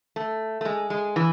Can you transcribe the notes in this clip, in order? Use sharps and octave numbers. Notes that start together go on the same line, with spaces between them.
A3
A3
G#3
G#3
E3